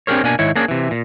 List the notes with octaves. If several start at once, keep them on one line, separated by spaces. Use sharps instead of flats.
C4 D4 G4 G#4 A#4 C#5
B2 A#3 D4 G#5
G#2 D#3 E4 C#5
A#3 C#4 D4 G#4
C3 E3
A#2